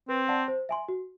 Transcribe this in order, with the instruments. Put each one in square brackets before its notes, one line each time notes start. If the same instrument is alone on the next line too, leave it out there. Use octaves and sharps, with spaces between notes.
[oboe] C4 [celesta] B4
[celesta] D5 F#5 A5
C5
E5 G#5 C6
F#4